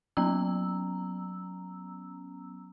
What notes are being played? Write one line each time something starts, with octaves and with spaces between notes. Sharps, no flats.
F#3 B3 C#4 A#5 E6